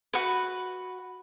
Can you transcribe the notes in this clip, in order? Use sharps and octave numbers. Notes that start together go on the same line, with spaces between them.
F#4 B4